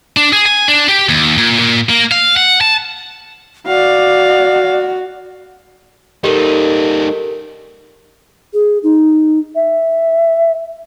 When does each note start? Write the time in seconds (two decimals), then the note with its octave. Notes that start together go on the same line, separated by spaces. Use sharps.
0.17 D4
0.33 G#4
0.46 G#5
0.68 D4
0.89 G4
1.09 D#2
1.38 A#2
1.59 A#2
1.89 A#3
2.12 F5
2.37 F#5
2.61 A5
3.67 F#4 D5 F5
6.24 G3 D#4 G4 A4 A#4
8.53 G#4
8.84 D#4
9.55 E5